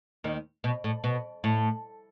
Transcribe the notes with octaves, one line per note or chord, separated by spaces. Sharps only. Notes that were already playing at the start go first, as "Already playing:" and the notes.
D#2 D#3
B2
A2
B2
A2